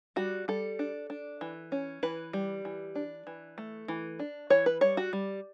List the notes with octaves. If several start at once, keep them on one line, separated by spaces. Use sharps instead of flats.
G3 F#4
G3 A4
D4
D4
E3
C#4
E3 B4
G3
E3
D4
E3
A3
E3
D4
E3 C#5
B4
G3 C#5
F#4
G3